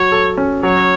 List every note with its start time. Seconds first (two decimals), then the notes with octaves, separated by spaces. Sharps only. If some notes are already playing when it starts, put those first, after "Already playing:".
Already playing: F#3 F#4 C#5
0.12 A4
0.37 C#4
0.63 F#3 C#5